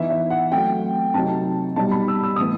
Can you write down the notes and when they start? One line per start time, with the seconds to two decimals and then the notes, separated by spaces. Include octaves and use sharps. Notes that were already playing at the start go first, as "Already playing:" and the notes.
Already playing: E3 B3 D#4 E5
0.10 E5
0.30 F#5
0.52 F#3 A3 C4 G5
1.14 C3 F#3 C4 D#4 A5
1.76 B2 G3 D#4 A5
1.91 B5
2.08 E6
2.23 E6
2.36 A2 E3 B3 D#6